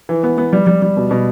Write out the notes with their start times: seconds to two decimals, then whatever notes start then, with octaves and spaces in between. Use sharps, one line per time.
0.09 E3
0.23 B3
0.38 B3
0.53 G3
0.67 G3
0.82 G3
0.97 B2
1.11 B2